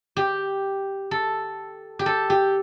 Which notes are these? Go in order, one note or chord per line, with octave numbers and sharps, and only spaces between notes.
G4
A4
G4
A4
G4